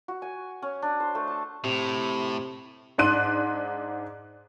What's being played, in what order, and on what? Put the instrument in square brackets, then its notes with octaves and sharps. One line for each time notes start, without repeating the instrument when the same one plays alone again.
[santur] F#4
G#5
C#4
D4
C5
A3
A5
[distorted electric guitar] A2 [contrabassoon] C3
[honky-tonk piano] G#2 D4 C6 F#6 D#7